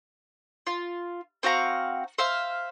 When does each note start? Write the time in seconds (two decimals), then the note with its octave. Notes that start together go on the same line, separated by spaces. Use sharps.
0.67 F4
1.43 C4 F#4 F5 A#5
2.18 C5 E5 F5